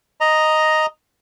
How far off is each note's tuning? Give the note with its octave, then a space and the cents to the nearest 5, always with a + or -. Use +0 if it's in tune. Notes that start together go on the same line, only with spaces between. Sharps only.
D#5 +0 A#5 +0